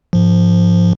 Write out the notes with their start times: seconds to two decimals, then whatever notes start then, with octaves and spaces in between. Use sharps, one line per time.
0.13 G#2 F3